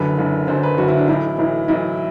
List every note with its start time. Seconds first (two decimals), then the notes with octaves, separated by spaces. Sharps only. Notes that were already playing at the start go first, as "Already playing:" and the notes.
Already playing: F#1 F#2 D3 B4
0.18 F#1 F#2 D3
0.48 F#1 F#2 D3 C5
0.63 B4
0.78 F#1 F#2 D3 F#4
0.88 E4
0.98 D4
1.08 B1 A2 E3 E4
1.38 B1 A2 E3
1.68 B1 A2 E3 E4